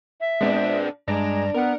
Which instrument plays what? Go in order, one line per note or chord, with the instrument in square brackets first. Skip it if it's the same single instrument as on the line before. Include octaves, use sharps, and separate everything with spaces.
[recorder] E5
[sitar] A#2 D4 [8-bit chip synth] G#3 B3 C4
[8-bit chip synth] G2 A#5 [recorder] G#3 [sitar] D4
[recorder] B3 [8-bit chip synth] A#4 F#5